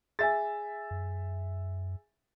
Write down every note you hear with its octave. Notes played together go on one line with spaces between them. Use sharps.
G#4 E5 G#5 A6
F#2